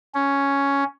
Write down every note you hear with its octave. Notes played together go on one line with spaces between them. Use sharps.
C#4